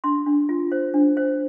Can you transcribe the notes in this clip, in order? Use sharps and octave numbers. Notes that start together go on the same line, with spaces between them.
D4 C6
D4
F4
C5
D4
C5